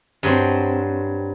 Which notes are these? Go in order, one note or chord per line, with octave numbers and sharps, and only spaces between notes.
G2 F#3 C4